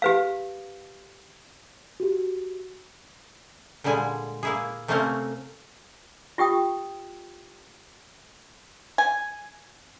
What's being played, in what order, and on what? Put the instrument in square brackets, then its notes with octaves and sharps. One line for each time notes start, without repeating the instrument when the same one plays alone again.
[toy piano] G4 B4 F5
[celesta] F#4 G4
[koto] A#2 D3 G3 G#3 G#5
A#3 E4 G#4
C3 A3 A#3 C4 C#4 A#4
[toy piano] F4 G4 G5 D#6
[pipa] G#5